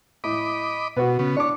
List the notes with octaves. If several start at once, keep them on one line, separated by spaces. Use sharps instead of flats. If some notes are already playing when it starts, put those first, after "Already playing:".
A2 D#5 B5 D6
B2 F#4 B4
C#3 B3
D4 C#5 D6